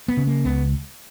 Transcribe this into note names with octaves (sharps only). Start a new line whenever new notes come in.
B3
C#3
A#3
C#2 B3